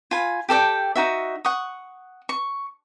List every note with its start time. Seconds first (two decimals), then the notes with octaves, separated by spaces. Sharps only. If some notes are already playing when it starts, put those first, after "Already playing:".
0.11 F4 G#5 B5
0.49 G4 A4 D5 G5
0.96 D#4 F#4 E5
1.45 F#5 C#6 D#6
2.29 C#6